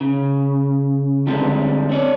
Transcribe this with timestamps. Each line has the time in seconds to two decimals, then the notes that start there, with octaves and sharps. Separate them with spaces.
0.01 C#3
1.27 D3 G3 G#3 C4 A4
1.90 C4 C#5 D5